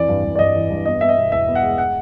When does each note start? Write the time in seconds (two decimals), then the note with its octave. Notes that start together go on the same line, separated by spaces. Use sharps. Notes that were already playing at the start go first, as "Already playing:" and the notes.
Already playing: F2 E3 D5
0.09 G2
0.25 G2
0.35 D5
0.39 G2 D#5
0.55 E3
0.70 G2
0.86 B3 D#5
1.01 B3 E5
1.09 D#5
1.16 B2
1.32 E2 E5
1.48 B3
1.55 F#5
1.63 G#3
1.78 F#5